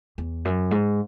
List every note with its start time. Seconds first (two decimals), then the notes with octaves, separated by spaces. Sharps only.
0.18 E2
0.45 F#2
0.71 G#2